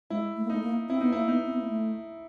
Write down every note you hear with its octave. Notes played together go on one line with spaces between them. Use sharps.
G#3 E4
A3
A#3
A3 D#4
A#3
C4 E4
B3 D#4
A#3 E4
B3 D#4
C4
B3
A#3
A3